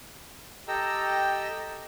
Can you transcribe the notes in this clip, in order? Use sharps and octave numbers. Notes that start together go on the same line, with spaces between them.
G4 A4 D#5 G5 A#5 E6